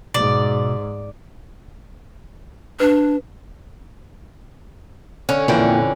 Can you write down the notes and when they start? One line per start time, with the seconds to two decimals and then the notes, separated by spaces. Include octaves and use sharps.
0.14 G#2 B2 D5
2.80 D4 B4
5.29 D3 C#4
5.48 F2 A#2 D3 E3 E4 G5